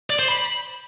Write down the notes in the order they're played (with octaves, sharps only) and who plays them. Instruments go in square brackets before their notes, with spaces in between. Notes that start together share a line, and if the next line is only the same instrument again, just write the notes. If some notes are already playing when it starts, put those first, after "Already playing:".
[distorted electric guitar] D5
C5
B5